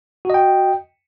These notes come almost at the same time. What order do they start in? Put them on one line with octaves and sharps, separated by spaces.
F#4 D#5 G5